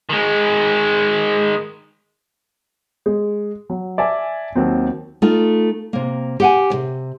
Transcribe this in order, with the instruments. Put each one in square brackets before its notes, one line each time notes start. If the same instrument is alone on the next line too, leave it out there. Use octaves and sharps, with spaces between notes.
[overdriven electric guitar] D#3 G#3
[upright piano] G#3
F#3
D5 E5 G#5 A5
D#2 F#3 C4
[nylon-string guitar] A3 D#4 F4
C3 A#3
G4 F#5 G#5
D2 C3